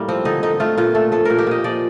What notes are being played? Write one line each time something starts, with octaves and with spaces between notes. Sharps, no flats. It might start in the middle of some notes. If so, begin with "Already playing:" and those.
Already playing: A2 G3 A#3
F3 C4
D3 D#4
D3 D#4
A3 F4
A#2 F4
A3 A4
F3 A4
A#2 A#4
G4
A#2 D#5
F3 D5